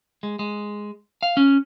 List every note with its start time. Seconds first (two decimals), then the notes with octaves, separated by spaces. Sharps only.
0.23 G#3
0.39 G#3
1.23 F5
1.37 C#4